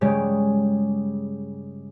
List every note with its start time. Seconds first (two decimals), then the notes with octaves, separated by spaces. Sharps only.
0.01 G2 C#3 G#3 G4